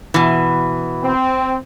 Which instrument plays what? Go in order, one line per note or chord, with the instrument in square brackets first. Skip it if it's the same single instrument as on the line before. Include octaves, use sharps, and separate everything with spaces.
[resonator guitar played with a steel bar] B2 E3
[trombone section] C4